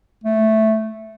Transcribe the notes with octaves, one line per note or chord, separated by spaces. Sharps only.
A3